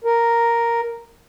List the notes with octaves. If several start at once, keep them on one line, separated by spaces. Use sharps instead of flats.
A#4